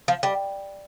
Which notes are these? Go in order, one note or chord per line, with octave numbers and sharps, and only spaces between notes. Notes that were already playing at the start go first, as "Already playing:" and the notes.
F3
G3